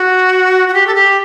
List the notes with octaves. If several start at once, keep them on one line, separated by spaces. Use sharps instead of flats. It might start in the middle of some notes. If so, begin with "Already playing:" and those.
Already playing: F#4
F#4
G4
A4
G4